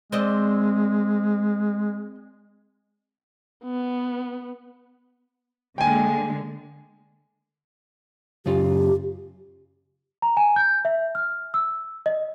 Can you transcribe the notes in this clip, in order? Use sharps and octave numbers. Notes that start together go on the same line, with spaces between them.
G#3 C4 D5 D#5
B3
D3 G#3 A#3 G5 G#5
F#2 C#3 F4 G4
A#5
G#5
G6
E5
F6
E6
D#5